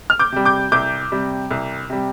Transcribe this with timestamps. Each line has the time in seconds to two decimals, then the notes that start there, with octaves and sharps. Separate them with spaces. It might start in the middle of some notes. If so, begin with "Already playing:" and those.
0.10 F6
0.19 D6 G6
0.32 C3 G3
0.45 D6 G6
0.72 C2 D6 G6
1.12 C3 G3
1.51 C2
1.90 C3 G3